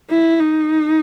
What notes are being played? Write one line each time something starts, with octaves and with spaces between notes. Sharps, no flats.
E4
D#4